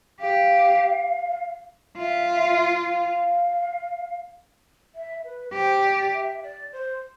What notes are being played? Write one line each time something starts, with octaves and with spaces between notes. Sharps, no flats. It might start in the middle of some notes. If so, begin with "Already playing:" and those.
G4 F5
F4 E5
F5
E5
B4
G4 C5
D5
E5
D5
C5